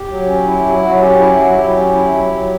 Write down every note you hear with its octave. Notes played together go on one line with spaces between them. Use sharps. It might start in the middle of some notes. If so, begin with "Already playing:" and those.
Already playing: G4
F#3
C#4
E4
F#3
F#3 F#4
C#4 G4
E4 G4
F#3 F#4
F#3 G4
C#4
E4
F#3
F#3